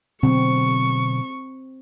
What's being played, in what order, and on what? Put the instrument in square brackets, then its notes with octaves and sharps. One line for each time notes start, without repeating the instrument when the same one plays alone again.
[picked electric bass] B2 D3 F#3 [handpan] C4 [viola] C#6